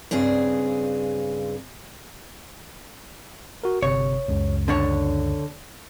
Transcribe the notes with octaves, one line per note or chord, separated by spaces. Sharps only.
G2 C#3 C4 G#4
F#4 A#4
G1 C3 C#5
C#2 F#2 C#3
D3 D4 C#5